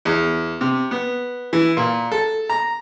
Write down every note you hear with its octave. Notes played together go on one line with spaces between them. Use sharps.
E2
C3
B3
E3
A#2
A4
A#5